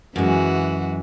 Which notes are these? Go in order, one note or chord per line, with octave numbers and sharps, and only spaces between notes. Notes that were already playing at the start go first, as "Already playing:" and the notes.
F#2 E3 G#3 F#4